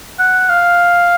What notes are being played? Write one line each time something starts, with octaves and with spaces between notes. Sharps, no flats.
F#5
F5